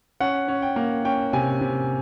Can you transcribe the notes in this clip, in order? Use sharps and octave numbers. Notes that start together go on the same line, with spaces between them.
C#4 F#5
C#4
G5
A#3
C#4 G5
C3 G#5
C3